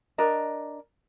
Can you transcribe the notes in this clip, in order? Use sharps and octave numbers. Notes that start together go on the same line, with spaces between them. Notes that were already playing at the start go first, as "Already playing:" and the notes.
D4 A#4 D#5